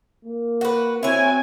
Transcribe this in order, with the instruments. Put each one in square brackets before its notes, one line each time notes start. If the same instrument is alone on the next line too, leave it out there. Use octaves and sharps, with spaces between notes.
[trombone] A#3
[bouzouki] F#4 B4
[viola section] C4 F#4 G#5 [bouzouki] E4 C#5